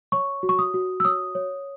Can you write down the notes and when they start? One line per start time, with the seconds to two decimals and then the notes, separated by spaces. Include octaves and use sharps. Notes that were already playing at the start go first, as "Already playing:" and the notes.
0.12 C#5 C#6
0.43 F#4
0.49 C#6
0.59 D#6
0.74 F#4
1.00 E6
1.05 C#5 D#6
1.35 C#5